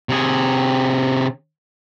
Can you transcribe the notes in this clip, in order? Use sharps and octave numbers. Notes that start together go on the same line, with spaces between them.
C3 G#4